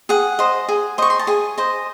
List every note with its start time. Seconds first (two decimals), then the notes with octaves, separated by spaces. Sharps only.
0.09 G#4 F#5
0.39 C5 D#5
0.69 G#4
0.98 C5 D#5 C#6
1.10 C6
1.19 A5
1.27 G#4 G#5
1.58 C5 D#5